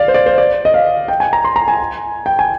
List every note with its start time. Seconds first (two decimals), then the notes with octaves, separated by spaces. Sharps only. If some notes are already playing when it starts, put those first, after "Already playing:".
Already playing: D5 F5
0.08 C5
0.14 D5
0.26 C5
0.38 D5
0.65 D#5
0.74 F5
1.08 G5
1.20 G#5
1.33 A#5
1.44 C6
1.56 A#5
1.68 G#5
2.26 G5
2.39 G#5